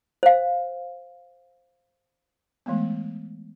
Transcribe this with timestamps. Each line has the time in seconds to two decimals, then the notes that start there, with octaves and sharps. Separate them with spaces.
0.23 C5 F5
2.66 E3 G#3 A3 B3